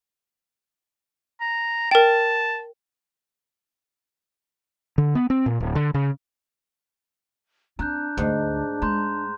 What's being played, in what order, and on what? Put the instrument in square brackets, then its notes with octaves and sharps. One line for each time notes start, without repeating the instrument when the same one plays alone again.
[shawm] A#5
[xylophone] A#4 G5 [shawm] A5
[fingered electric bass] D3
B3
C4
A#2
D1
D3
C#3
[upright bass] C4 [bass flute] D4 [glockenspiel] A#5 F#6 G6
[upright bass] D2 [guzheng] G#2
[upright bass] G#3 [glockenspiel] A#5 C6 G6